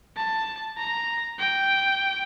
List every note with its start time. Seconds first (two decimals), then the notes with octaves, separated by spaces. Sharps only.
0.17 A5
0.78 A#5
1.39 G5